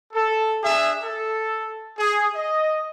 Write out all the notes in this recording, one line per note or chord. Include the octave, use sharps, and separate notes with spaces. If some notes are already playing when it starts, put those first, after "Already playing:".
A4
D4 G#4 E5
A4
G#4
D#5